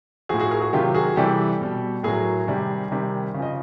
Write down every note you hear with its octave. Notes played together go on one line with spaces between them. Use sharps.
A2 F3 F#4 G#4
F#4 G#4
G#4 A#4
F#4 G#4
C3 D#3 F#3 F4 G4
F#4 G#4
C3 E3 G3 G4 A4
B2 G3
A2 F#3 G#4 A#4
C3 D#3 G3
C3 D#3 G3
C#3
F3 D#5